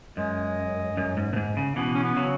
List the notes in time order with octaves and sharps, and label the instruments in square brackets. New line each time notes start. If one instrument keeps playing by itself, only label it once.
[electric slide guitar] F#2 [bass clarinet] G#3
[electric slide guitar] F#2
G#2
B2
G#2
C#3
[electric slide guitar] B2 E3 [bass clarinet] B3
[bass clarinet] C#4
B3
[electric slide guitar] C#3 F#3